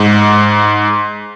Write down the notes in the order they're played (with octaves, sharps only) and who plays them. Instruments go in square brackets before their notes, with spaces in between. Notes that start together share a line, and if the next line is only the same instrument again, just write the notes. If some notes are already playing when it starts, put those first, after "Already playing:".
Already playing: [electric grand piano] G#2